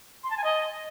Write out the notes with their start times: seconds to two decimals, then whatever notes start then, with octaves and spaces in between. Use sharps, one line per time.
0.24 C6
0.30 A5
0.37 G#5
0.44 D#5